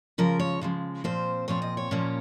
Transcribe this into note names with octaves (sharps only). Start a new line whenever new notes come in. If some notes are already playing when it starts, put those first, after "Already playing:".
C#3 F3 G#3 A#4
C#5
C#3 F3 G#3
A#2 F3 C4 C5
A#2 F3 C4 C#5
D#5
C#5
A#2 F3 A#3 C#4